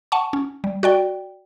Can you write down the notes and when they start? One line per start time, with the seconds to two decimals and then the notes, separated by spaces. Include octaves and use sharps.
0.12 F#5 G#5 A5 C#6
0.33 C#4
0.64 G3
0.83 F#4 D5 G5